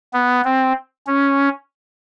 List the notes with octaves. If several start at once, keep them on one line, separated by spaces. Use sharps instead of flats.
B3
C4
C#4